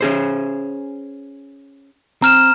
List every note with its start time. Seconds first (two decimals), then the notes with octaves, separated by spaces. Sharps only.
0.01 C#4 G#4 C5
2.22 C4 A#5 F6 E7